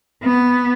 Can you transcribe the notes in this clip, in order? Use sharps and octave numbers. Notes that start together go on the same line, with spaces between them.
B3